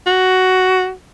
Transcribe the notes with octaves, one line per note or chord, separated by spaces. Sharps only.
F#4